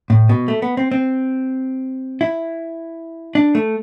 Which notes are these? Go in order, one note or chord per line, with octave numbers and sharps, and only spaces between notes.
A2
B2
A3
B3
C4
C4
E4
D4
A3